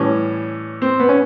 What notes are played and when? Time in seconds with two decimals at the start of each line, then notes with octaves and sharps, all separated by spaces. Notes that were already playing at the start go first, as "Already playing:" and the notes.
Already playing: A2 E3 G3 C#4
0.82 C4
1.00 B3
1.09 C#4